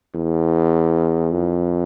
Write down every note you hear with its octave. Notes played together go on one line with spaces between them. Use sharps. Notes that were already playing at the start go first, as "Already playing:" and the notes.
E2
F2